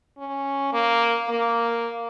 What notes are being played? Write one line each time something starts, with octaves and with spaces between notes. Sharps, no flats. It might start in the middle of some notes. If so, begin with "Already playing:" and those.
C#4
A#3
A#3